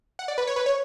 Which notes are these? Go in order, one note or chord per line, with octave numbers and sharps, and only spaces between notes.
F#5
D5
B4
C#5
B4
C#5